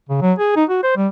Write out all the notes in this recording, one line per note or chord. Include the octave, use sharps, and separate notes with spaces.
C#3
F#3
G#4
D#4
F#4
C5
G3